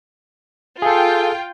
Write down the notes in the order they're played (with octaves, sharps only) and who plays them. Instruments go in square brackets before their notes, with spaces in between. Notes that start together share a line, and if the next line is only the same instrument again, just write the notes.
[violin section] F4 G5 [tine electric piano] G#4 A4